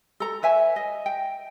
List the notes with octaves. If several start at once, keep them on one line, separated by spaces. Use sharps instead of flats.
A4 A#5
B4 C#5 E5 G#5
D#5
G5